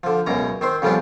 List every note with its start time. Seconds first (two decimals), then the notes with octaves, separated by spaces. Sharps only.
0.03 D3 F3
0.26 C#2 F#2 B2 A#5
0.61 D#3 C4 C5
0.82 F2 C#3 F3 G3 B3 D4